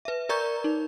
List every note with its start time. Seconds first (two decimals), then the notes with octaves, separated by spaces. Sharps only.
0.05 B4 E5
0.29 A#4 D5 A#5 C#6 G6
0.64 D#4